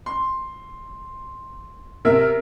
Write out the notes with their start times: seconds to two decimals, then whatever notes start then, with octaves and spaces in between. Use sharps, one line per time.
0.06 C6
2.05 C3 A#4 E5